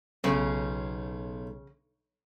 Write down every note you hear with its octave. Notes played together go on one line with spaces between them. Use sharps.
B1 C#3